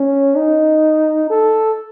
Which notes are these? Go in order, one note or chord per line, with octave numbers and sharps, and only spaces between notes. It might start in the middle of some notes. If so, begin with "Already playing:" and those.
Already playing: C#4
D#4
A4